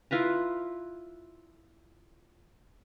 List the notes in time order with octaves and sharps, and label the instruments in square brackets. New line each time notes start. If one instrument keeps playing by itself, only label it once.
[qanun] E4 F4 B4 A#5